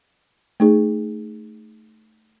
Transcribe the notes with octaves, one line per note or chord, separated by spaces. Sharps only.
A3 D#4 G#4